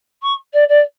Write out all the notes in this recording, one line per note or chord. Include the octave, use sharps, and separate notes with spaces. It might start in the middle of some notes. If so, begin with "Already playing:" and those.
C#6
D5
D5